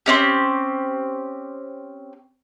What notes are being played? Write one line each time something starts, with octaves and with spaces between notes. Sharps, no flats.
C4 C#4 G4